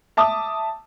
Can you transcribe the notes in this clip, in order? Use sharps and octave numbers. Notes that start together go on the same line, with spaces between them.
E5 A5 D6 D#6